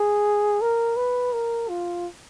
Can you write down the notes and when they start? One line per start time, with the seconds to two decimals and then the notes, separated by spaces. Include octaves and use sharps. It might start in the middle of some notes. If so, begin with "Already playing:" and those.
Already playing: G#4
0.61 A#4
0.97 B4
1.33 A#4
1.69 F4